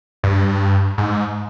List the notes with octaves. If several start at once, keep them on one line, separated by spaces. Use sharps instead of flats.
G2
G#2